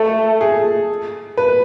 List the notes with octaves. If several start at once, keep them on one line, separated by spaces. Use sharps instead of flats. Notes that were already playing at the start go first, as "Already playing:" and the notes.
Already playing: A3 A4
G#4
B4